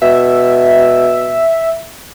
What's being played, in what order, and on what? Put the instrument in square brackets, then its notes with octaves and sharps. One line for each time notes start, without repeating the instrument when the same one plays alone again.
[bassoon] B2 [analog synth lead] E5